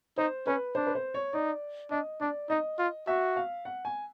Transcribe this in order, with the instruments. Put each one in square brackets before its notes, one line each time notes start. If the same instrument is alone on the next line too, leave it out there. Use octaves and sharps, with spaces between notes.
[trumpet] D#4 [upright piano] C5
[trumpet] C#4 [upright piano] B4
[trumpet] D4 [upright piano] C5
[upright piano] B4
C5
C#5
[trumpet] D#4 [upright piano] D5
[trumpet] D4 [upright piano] D#5
[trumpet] D4 [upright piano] D5
[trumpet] D#4 [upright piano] D#5
[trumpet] F4
[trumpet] F#4 [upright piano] E5
[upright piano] F5
F#5
G#5